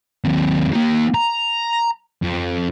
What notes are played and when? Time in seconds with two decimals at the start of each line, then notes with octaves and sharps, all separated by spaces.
0.25 D#2 C4
0.74 A#3 D#4
1.14 A#5
2.23 F2